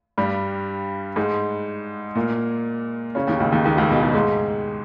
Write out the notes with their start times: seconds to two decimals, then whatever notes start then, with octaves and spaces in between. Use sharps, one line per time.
0.18 G2 G3
1.16 G#2 G#3
2.15 A#2 A#3
3.15 C#3 C#4
3.27 D#2 D#3
3.39 C#2 C#3
3.52 D#2 D#3
3.64 D#2 D#3
3.77 C#2 C#3
3.90 B2
4.02 C#2 C#3
4.14 G#2 G#3